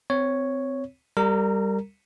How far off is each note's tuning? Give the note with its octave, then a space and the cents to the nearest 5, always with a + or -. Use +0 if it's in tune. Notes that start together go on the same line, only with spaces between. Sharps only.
C4 -25 C#5 +0
G3 +10 A#4 -30 A#5 +0